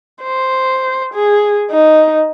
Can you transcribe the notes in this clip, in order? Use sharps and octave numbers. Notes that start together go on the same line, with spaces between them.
C5
G#4
D#4